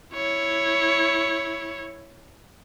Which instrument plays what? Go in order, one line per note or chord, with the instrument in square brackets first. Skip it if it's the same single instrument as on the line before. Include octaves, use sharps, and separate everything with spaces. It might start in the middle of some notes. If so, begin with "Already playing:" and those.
[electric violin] E4 C#5